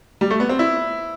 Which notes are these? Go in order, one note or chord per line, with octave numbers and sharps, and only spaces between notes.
G3
A3
B3
C4
E4